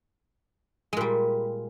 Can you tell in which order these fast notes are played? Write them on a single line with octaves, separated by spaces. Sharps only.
G#3 A#2 G3